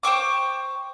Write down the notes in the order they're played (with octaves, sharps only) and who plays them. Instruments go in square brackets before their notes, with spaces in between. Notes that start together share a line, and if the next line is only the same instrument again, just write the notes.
[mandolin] C5 G5 C#6 D6